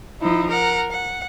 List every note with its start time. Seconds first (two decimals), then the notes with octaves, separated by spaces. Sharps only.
0.21 F3 D#4 E4
0.49 A#4 F#5
0.91 F#5